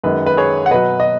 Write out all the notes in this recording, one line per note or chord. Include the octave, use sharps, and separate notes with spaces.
F#2 D#3 G#3 B4
B4
G#4 C#5
F#5
B2 F#3 B4 D#5
D#5